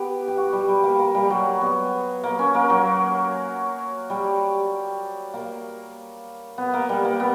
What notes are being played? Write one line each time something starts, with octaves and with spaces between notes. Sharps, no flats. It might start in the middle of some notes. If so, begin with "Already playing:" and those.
Already playing: B3 G4
G4
F#4
G3
G3
A#3
A#3
G3
F#3
B3
A#3
C#4
A#3
F#3
G3
A#3
B3
A#3
G3
A#3
B3